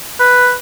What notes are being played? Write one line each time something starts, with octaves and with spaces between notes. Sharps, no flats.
B4